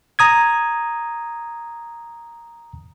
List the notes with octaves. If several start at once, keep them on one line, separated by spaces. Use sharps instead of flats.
A#5 D#6 G#6